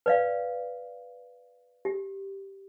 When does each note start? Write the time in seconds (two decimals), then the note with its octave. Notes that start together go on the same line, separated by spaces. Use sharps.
0.06 B4 D5 F5
1.85 G4